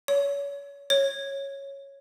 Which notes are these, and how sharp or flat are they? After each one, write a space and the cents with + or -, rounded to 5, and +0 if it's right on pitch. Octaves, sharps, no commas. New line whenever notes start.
C#5 +30
C#5 -5